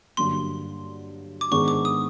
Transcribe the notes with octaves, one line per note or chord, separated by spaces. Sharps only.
G2 D3 F#3 A#3 C6
D6
G#2 D#3 G#3 B3 D4 C#6
D6
D#6